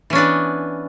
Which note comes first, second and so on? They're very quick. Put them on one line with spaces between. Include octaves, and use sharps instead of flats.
E3 C#4 D4 B3